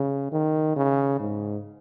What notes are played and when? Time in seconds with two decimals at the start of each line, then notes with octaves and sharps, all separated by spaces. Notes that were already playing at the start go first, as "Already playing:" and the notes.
Already playing: C#3
0.32 D#3
0.76 C#3
1.19 G#2